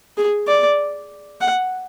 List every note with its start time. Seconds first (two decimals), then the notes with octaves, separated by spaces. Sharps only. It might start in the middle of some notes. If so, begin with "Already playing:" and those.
0.17 G#4
0.47 D5
1.41 F#5